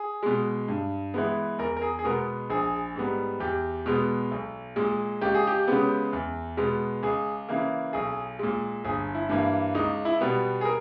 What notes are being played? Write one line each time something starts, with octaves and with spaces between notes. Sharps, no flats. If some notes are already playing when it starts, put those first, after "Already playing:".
Already playing: G#4
B2 G#3
G2
E3 G#3 B3
E2 A#4
A#4
G#4
G#4
B2 G#3 B3 A#4
A#1 G#4
G#2 G3 B3
E2 G4
B2 G#3 B3
B1
A#2 G#3
C#2 G4
G#4
G4
C#3 G#3 B3
E2
B2 G#3 B3
C#2 G#4
C#3 E3 A#3
B1 G#4
A#2 G#3
G1 G#4
E4
G2 E3 A#3
C#2 D#4
E4
B2 G3 B3
G#4
A#4